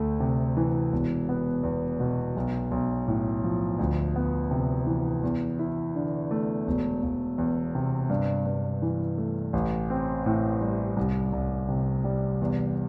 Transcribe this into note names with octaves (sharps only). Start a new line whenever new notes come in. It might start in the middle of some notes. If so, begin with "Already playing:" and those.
Already playing: D2 A3
C3
E3
E1
B3
E2
B2
B1
B1
A2
F3
D2
B3
C3
E3
E2
E4
D3
A3
E1
E1
E2
C3
G2
G2
E3
A3
A1
C4
A2
G3
C2
C2
C3
G3
E2